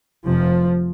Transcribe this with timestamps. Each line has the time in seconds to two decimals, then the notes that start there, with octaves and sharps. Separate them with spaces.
0.26 F1 F2 C3 F3